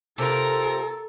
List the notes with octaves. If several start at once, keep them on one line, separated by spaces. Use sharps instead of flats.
C3 F4 A4 A#4